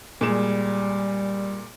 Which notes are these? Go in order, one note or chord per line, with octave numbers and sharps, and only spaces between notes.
A#2 G3 G#3 E7